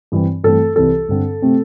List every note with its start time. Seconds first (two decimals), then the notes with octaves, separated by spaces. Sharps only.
0.12 G2 E3 C4
0.44 G2 E3 A3 C4 A4
0.76 C2 C3 E3 A4
1.09 G2 D3 C4
1.42 C3 A3 C4